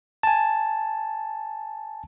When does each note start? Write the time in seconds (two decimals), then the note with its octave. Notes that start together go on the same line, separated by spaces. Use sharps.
0.23 G#5 A5